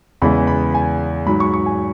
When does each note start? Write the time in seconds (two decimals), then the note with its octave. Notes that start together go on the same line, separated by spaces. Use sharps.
0.22 E2 C#3 E3 G#3 B5
0.47 B5
0.74 G#5
1.27 G#2 F#3 B5
1.40 C#6
1.54 C#6
1.66 G#5